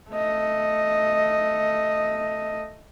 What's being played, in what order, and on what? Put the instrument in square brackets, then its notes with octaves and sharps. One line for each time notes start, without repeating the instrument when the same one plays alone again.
[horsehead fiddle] A3 D#5